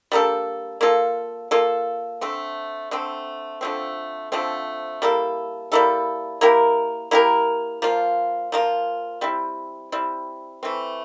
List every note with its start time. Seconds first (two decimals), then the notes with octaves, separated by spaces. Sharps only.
0.12 G3 A#3 D4 A4
0.81 A#3 F4 A4
1.51 A#3 F4 A4
2.21 D3 A3 C4
2.91 D3 A3 C4
3.61 D3 F3 A3 C4
4.32 D3 F3 A3 C4
5.02 G3 A#3 E4 A4
5.72 G3 A#3 E4 A4
6.41 A#3 E4 G4 A#4
7.11 A#3 E4 G4 A#4
7.82 F3 A#3 F4
8.52 F3 A#3 F4
9.21 G3 C4 E4
9.92 G3 C4 E4
10.63 E3 A3 C4